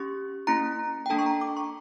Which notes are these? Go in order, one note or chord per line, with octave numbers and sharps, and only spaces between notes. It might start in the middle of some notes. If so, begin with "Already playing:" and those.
Already playing: C#4 G4 C#6
A#3 C#4 E4 A#5
G5
A#3 D4 A4 A5
C#6
A#5
D6
C#6